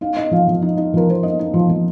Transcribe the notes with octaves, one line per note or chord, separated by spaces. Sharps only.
D#4 F5
D#4 D#5
F3 F5
F3
D#4
D#4
F3 A#4
F3 C5
D#4 D#5
D#4
F3
F3